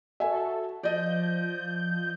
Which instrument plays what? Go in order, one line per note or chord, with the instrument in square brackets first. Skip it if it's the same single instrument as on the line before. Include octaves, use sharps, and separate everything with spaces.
[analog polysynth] F#4 A4 [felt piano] E5 G#5
[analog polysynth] F3 G6 [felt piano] D5 D#5